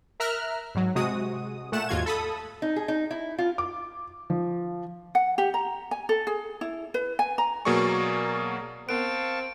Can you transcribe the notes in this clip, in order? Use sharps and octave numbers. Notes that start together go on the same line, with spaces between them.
A#4 E5 A#5 F6 F#6
G#2 F#3
C3 G#3 F#4 D#6
A#2 A3 F#5 E7
D#2 G#2 F4 F#4 G#6
A4 B5 D#6
D#4
G#4
D#4
E4
F4
D6
F3
F#5
G4
A#5
G#5
A4
G#4
E4
B4
G#5
A#5
B2 F#3 A#3 G#4 D5 C#6
B3 C4 A#4 F5 A5 C#6 D7